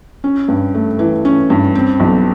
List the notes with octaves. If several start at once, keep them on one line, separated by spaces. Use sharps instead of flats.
C#4
G2
A3
E3
C#4
G2
C4
B1